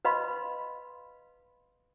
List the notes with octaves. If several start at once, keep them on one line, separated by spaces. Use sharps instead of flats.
B4 D#5 F5 B5 C6